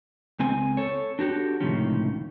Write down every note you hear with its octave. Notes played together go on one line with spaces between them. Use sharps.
C#2 C4 G#5
A4 C#5
D4 F#4 G4 A4
C#2 A2 C3 D#3 F3 C#4